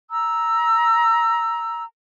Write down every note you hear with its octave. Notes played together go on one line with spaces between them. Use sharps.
A#5 E6